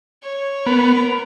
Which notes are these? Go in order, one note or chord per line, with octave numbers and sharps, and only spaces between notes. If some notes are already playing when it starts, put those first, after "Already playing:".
C#5
B3 A#4